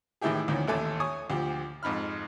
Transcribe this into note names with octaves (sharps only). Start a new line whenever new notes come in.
A2 D#3 E3 E4 G4 G#4
D2 A#2 D#3 F3 C#4
A1 D#2 A3 A4 G#5 D6
C#5 G#5 C#6 D#6
D2 F3 G4
F2 G#2 D#4 B5 F6